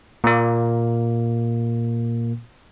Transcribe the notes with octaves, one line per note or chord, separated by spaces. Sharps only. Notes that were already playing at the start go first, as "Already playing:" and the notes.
A#2 A#3